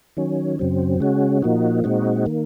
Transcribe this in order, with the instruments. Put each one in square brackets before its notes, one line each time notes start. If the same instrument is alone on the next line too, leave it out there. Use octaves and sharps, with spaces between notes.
[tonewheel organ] D#3 F#3 C#4
F#2 C#3 F#3 C4
C#3 G#3 C#4 F#4
A#2 F3 A#3 D#4 F#4
A#2 G#3 C4 D#4 F#4
D#3 A#3